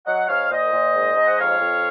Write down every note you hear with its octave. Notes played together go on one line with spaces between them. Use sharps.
F#3 D#5 F#5
G#2 C#5 F5
A#2 C5 D#5
A#2
G#2
G#2
F#5
F2 C#5 F5
F2